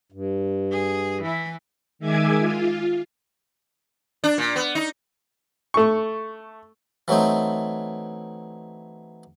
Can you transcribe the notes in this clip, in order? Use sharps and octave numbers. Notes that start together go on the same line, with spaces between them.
G2
G#4
E3 E4
D#3 G#3 E5 G#5 D6 G#6
F4
D4
A#2
B3
D#4
A3 C#6
E3 F#3 A3 C4 D#4